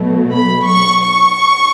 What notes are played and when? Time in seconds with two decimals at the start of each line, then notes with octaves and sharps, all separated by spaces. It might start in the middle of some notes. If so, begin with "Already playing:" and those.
Already playing: B2 F#3 A3
0.33 B5
0.67 C#6
1.01 C#6